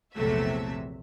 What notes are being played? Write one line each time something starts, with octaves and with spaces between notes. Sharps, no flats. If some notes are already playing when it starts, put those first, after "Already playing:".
A#1 E2 C3 F#3 A3 E5